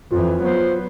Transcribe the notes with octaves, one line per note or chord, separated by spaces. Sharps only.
F2 E3 F4
F#3 B3 C5